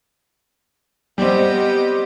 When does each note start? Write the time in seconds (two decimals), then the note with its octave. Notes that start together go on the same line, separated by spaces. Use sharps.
1.18 G3 B3 C4 G4 D#5